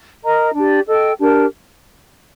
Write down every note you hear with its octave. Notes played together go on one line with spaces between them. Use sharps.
A#4 D#5 A#5
D4 G4 D5
A4 D#5 G5
D4 G4 A#4